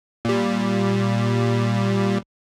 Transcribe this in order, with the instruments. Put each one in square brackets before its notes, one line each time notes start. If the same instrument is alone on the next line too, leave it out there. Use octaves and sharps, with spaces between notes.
[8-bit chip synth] A#2 G3